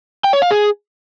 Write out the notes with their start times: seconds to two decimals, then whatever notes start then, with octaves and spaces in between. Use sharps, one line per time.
0.24 G5
0.33 C#5
0.42 F5
0.51 G#4